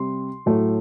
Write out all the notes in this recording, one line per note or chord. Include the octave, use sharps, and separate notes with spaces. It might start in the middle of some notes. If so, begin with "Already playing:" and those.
Already playing: C3 G3 C6
A2 F#3 A3